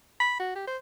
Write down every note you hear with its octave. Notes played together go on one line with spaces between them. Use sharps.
B5
F#4
G4
C5